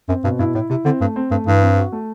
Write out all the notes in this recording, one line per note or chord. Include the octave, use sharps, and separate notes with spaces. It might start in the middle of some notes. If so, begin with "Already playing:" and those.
F#2 C4
G2 B2
G2 E4
A2 E4
C3 E4
D3 C4
G2 A3
C4
G2 A3
G2 E3
C4
F#4
A3